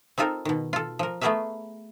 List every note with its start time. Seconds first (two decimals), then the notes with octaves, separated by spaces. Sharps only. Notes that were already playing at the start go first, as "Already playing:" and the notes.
0.18 C4 D#4 F4 A4 A#4
0.45 B2 D#3
0.73 F4 A4
0.99 F3 A#4
1.21 A3 B3 F#4 G#4 A#4 E5